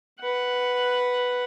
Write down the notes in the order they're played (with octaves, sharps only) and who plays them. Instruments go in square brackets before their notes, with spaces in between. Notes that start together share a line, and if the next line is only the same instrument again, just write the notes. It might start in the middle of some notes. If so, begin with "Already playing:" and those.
[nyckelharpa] B4 F#5